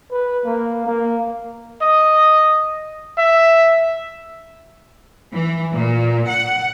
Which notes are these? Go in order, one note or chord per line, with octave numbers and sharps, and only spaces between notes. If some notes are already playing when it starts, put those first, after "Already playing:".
B4
A#3
A#3
D#5
E5
E3
A#2
F#5